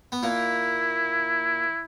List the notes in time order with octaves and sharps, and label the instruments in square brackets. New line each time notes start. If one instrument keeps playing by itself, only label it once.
[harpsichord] B3
[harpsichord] A#2 A#3 [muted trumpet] E4